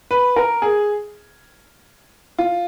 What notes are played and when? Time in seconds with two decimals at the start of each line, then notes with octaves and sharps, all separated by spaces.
0.11 B4
0.36 A#4
0.62 G#4
2.38 F4